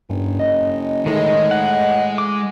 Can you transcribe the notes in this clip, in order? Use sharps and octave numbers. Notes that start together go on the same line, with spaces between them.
F#1 G2
D#5
A2 D#3 G#3
F#5
D6